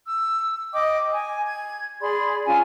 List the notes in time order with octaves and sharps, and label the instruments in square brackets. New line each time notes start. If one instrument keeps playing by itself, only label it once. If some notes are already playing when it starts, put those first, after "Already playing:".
[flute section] E6
D#5 G5 D6 D#6
G#5
G#6
G#4 D5 B5 C6
C#4 F4 G#5